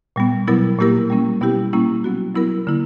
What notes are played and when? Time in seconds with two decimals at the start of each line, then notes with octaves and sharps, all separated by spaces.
0.16 A#2 G3 B3
0.47 B2 F#3 B3 E4 A#4
0.78 A#2 A#3 E4 G4 A#4
1.10 G3 A#3 C#4
1.41 B2 G3 B3 E4 G4
1.73 A#2 G3 A#3 C#4 E4
2.04 F#3 B3 F#4
2.35 F#3 B3 E4 A#4
2.67 D3 A#3 E4